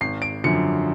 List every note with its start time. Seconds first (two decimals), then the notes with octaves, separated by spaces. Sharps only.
0.01 G#1 C7
0.22 D7
0.44 F#2 D3 F3 C#7